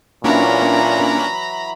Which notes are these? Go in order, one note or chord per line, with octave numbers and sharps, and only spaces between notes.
A#2 E3 F#3 A#3 C#4 D4 A#5 B5